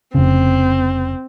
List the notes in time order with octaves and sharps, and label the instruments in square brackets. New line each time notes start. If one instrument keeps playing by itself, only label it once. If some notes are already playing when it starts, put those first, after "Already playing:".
[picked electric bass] F1 C#3 [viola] C4